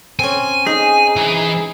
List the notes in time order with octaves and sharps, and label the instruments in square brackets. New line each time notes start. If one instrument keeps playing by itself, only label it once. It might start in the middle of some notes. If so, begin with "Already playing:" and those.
[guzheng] C4 C#4 [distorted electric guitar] G#5
[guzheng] D#4 [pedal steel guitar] G#4
[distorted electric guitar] E3